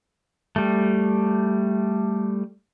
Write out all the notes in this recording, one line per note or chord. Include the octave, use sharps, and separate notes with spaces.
G3 A3